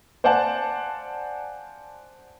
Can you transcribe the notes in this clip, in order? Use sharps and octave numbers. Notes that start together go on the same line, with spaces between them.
C5 D5 F5 F#5 G#5 A5